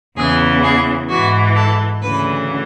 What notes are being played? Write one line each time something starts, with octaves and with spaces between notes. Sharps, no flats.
E2 C#3 E3 G#4
G#4
G#2 E3 F#4
A4
D2 C#3 E3 B4